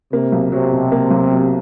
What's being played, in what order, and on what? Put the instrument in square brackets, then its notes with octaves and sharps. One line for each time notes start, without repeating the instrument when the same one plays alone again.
[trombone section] C3 [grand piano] A#3
[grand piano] B1
[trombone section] C3 [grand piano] F#3
[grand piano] B2
A#3
B1
F#3